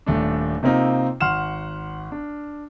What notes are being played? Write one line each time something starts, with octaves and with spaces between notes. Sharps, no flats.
D#1 A3 D4
C3 A#3 C4 D#4 F4
G#1 F#5 C6 F6 E7
D4